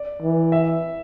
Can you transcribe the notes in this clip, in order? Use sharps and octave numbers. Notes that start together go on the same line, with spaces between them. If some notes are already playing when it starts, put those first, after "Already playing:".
Already playing: D5
E3
E5